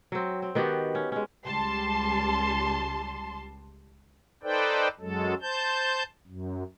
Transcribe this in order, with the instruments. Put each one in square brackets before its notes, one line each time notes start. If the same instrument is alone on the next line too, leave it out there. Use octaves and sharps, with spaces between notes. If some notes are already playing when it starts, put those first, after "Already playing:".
[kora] F#3 C4
C4
D#3 B3 F#4 G4
C#4
G#3 C#4
[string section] C#2 G3 A5 C6
[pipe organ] D#4 A4 B4 C5 D5 G5
F#2 F#3 G#3 A4
C5 A5 G6
F#2